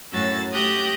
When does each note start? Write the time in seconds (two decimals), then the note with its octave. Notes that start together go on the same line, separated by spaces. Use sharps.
0.13 F#2 A2 C#4 F#4 E6 A6
0.52 A3 G4 D#6 F#6 G6 A#6